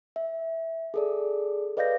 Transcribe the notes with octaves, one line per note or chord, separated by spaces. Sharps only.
E5
G#4 A4 D5
B4 D5 D#5 F5 G6 A#6